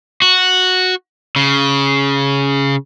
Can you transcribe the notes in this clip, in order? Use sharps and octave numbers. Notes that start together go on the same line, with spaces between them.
F#4
C#3